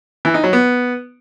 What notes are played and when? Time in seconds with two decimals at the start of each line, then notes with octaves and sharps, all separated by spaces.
0.25 E3
0.34 D#4
0.44 F#3
0.53 B3